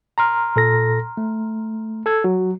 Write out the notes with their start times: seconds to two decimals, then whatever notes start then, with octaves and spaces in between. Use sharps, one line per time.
0.18 A#5 C6 F6
0.56 A#2 A4 A#6
1.17 A3
2.06 A4 E6 G#6
2.24 F#3 F#4